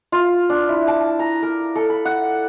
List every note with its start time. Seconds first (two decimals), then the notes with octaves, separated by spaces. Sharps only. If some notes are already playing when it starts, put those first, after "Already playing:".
0.12 F4
0.50 D4
0.69 E4
0.88 A5
1.19 A#5
1.42 A#4
1.76 A4
1.90 B5
2.05 F#5